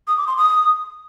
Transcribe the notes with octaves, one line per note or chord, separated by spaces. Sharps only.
D#6
D6
C6
D#6